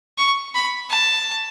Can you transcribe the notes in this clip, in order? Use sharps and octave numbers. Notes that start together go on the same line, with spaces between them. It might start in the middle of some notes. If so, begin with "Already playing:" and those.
C#6
B5
A5